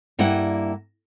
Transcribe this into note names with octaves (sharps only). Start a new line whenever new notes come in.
G2 G3 A#3 E4 F#5